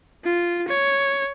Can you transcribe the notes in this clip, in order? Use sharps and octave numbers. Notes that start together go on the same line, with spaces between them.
F4
C#5